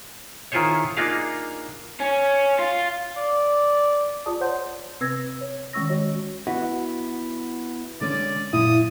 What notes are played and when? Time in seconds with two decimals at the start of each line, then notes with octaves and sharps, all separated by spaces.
0.52 D#3 E4 F4 G#4 C5 C#5
0.97 A#3 D4 D#4 F4 G#4 F5
2.00 C#4
2.59 F4
3.17 D5
4.26 F4 G#4 D5 A5 D#6
4.41 C5 C#5 F#5 C6 G6
5.00 C3 C4 B4 E6 G#6 A#6
5.41 C#5
5.73 D#3 G#3 C#4 C#6 E6 A#6
5.89 F#4 C#5 D#5
6.47 B3 E4 F#4
8.01 D3 G#3 C#4 D5
8.53 F#2 A#2 E4 D#6